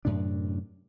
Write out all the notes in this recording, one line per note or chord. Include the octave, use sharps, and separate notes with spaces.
F#2 A2 C3 D4